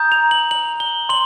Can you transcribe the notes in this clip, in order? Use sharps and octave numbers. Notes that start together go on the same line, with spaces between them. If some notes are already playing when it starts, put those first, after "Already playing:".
Already playing: A#5 D#6 G6
F7
F#7
F#7
G7
C6 F#7